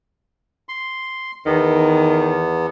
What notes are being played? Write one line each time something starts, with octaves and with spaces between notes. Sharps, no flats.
C6
E2 D#3 B3